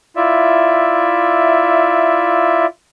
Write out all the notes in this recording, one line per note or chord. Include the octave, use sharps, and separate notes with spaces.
E4 F4 D5 E5